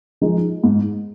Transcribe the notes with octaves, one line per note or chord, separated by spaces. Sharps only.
F3 G#3 D#4 G#4
G#2